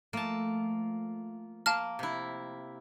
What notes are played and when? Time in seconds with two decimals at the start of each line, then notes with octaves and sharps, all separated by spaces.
0.13 F3 A3 A#3 A5
1.66 A#3 F5 A5 F6
1.99 C3 E4